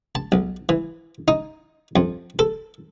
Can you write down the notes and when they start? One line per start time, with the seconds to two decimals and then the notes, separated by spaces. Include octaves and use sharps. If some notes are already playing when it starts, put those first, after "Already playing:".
0.15 A5
0.32 B1
0.69 E3
1.28 D#4
1.96 F2
2.39 A4